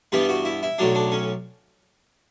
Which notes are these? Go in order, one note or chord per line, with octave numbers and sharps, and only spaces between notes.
G2 E3 G3 B3 B4
F#4
E4
E4
B1 A2 F#3 D4
D4
C#4